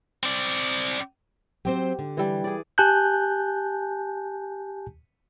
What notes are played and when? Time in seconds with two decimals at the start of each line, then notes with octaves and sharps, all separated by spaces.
0.23 C4 D5
1.65 F#3 C4 G4 C5
1.99 D3
2.17 E3 G3
2.44 G#4 D5
2.78 G4 G#5 A5 F#6 G6